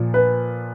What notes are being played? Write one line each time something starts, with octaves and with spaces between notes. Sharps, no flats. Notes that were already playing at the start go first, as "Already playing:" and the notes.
Already playing: A#2 F3
B4